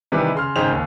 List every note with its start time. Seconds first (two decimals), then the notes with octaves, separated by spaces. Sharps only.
0.12 C3 D#3 E3 G3 B4
0.35 C#3 C6 F6
0.56 G#1 C#3 D#4 C5 G5 F7
0.71 D#2